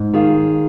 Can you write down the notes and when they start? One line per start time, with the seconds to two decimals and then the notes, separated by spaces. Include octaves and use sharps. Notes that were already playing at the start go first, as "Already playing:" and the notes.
Already playing: G#2
0.14 D#3 F4 G#4